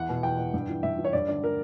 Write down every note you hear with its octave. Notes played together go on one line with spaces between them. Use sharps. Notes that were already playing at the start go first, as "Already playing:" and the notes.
Already playing: E2 F#5
B2
E2 G5
B2
G2
E3
G2 E5
E3
C#5
G2 D5
D3 D5
A#4